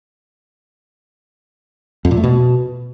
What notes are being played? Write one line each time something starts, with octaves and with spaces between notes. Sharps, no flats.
F2
A#2
A3
B2